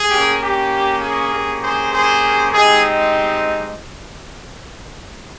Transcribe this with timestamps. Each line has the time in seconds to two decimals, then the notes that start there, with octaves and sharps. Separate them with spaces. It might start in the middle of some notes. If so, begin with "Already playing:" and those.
Already playing: G#4
0.10 A#3 C#4 G4
0.41 G4
1.01 G#4
1.32 A#3 C#4 G4
1.61 G#4 C5
1.92 G#4 C5
2.52 G#3 C4 D#4 G4 G#4